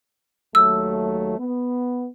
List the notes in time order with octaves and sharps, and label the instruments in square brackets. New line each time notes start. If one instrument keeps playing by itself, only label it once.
[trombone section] D#2 F#3 A3 [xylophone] E6
[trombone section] B3